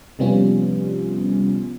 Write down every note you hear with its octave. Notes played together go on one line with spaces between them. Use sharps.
C3 F3 G3 B3 C#4 F4